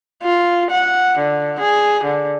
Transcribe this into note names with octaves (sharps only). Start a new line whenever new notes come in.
F4
F#5
D3
G#4
D3